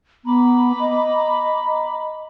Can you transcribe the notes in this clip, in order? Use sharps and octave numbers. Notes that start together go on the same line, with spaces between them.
B3 A#5 B5 D6
D#5